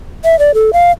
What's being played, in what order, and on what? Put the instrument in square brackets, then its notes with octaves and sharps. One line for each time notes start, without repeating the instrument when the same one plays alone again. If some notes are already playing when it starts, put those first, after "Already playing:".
[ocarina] E5
D5
A4
F5